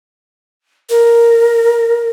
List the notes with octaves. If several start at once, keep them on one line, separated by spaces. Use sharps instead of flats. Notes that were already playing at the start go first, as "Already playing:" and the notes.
A#4